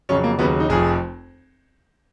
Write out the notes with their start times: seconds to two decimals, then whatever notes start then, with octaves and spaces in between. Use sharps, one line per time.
0.09 F2 C#3 F#3 C#4
0.24 A#3
0.39 D#2 C#3 F#3 B3
0.60 D#4
0.69 F1 F2 F3 G#4